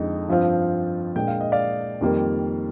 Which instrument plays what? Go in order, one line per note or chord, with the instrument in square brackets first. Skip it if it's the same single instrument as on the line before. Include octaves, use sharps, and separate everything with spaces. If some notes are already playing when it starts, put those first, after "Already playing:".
Already playing: [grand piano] F2 D3 G#3 D#4
G2 F3 C4 F4
A#2 G#3 D4 G5
F5
D#5
D5 F5
F2 D#3 G3 A#3